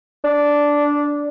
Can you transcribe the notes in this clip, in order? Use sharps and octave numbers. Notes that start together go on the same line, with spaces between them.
D4